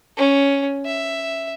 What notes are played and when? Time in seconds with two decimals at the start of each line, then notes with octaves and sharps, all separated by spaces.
0.17 C#4
0.86 E5